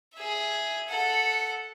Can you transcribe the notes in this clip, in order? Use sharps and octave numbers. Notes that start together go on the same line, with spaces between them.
G#4 E5
A4 F#5